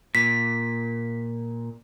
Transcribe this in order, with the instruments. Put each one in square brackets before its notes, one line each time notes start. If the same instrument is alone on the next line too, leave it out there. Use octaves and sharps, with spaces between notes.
[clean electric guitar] A#2 [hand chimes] B6